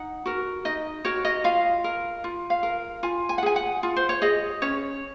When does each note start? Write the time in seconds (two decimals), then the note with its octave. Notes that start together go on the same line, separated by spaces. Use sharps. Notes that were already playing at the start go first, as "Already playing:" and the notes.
Already playing: D#4 F#5
0.26 F#4 A#4
0.65 D#4 D#5
1.05 F#4 A#4 C#5
1.25 D#5
1.44 F4 F5
1.84 A#4
2.24 F4
2.50 F5
2.63 A#4
3.03 F4 G#5
3.29 G#5
3.38 F#5
3.43 G#4 G#5
3.56 F#5
3.83 F4
3.96 C5
4.09 C#5
4.22 G#4 D#5
4.62 C#4 C#5